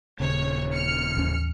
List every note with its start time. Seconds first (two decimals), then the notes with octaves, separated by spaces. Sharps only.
0.20 D#1 C#3 C#5
0.72 F6 C#7
1.15 A1 D#2 C#4